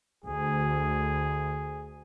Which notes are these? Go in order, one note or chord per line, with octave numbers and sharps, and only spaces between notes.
D2 G#4